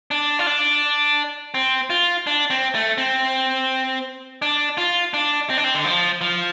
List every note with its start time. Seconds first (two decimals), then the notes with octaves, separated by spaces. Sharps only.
0.11 D4
0.39 F4
0.47 D4
1.54 C4
1.90 F4
2.27 D4
2.50 C4
2.75 A3
2.98 C4
4.42 D4
4.78 F4
5.14 D4
5.50 C4
5.57 D4
5.64 C4
5.74 D3
5.85 F3
6.21 F3